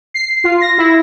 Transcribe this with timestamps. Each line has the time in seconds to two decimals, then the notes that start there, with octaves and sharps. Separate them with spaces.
0.14 C7
0.44 F4
0.61 A#6
0.78 E4